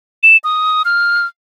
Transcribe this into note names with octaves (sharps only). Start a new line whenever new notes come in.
E7
D#6
F6